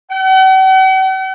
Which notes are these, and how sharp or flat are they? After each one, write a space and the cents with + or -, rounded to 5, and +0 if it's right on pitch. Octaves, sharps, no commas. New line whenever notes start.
F#5 +45